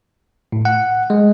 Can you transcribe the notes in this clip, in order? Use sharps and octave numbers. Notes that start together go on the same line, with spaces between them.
A2
F#5
G#3